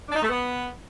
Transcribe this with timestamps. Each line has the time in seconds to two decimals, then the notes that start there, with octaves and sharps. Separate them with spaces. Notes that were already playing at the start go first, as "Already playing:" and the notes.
0.08 D4
0.15 D#4
0.22 A3
0.28 B3